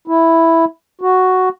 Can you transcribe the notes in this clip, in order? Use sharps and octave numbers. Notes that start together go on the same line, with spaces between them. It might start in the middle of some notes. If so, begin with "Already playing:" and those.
E4
F#4